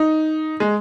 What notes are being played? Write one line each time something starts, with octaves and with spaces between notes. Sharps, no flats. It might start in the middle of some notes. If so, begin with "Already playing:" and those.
Already playing: D#4
G#3